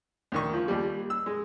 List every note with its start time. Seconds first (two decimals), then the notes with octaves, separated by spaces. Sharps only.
0.32 D2 D#3 C#6
0.53 F3
0.68 D#2 G3
1.10 E6
1.26 G#3